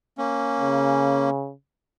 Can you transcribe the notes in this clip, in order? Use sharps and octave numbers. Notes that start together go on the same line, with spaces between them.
A#3 C#4
C#3